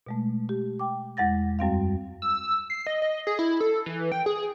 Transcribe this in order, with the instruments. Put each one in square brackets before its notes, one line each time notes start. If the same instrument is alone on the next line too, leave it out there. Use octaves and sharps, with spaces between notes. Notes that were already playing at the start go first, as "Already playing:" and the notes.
[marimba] B2 G#3 A3
G4
G5 D6
E2 G#3 F#5 A6 A#6
F#2 G3 C4 F5
[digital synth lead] E6
C7
D#5
D#5
G#4
E4
A4
E3
G5
G#4